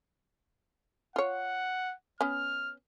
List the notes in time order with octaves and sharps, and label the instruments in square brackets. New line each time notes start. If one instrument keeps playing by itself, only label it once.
[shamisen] F4 C#5 [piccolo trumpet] F#5
[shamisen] B3 C#4 [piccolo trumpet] F6